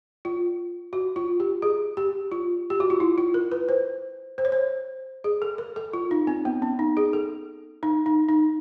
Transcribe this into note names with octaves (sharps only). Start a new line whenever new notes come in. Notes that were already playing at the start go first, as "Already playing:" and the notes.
F4
F#4
F4
G4
G#4
G4
F4
G4
F#4
F4
E4
F4
A#4
B4
C5
C5
C#5
C5
G#4
A4
A#4
A4
F4
D#4
C4
B3
C#4
D#4
G#4
A4
D#4
D#4
D#4